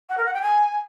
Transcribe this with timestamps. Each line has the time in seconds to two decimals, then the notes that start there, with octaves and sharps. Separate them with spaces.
0.09 F#5
0.17 A#4
0.26 F#5
0.34 G5
0.42 G#5